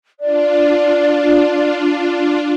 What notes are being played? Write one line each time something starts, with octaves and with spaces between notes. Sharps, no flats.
D4 F4 D5